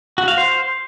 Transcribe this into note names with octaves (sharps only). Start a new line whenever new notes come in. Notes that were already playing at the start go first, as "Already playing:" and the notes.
F#4
F5
C5